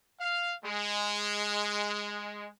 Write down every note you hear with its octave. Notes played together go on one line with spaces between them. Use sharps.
F5
G#3